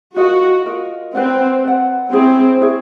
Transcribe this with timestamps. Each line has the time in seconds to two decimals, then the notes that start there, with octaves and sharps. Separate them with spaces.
0.16 F4 F#4 A#4 D#5
0.66 F4 A#4 D#5
1.14 C4 B4 D5 F#5
1.64 B4 D5 F#5
2.12 C4 E4 G#4 C#5
2.61 E4 G#4 C#5